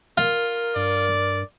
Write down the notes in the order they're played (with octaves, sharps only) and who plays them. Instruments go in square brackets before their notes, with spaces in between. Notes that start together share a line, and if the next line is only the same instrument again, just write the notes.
[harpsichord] F4 [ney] A#4
[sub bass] G2 [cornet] D5